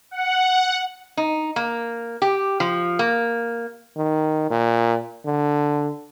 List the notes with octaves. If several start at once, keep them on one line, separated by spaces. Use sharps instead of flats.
F#5
D#4
A#3
G4
F3
A#3
D#3
A#2
D3